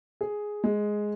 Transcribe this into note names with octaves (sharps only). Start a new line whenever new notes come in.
G#4
G#3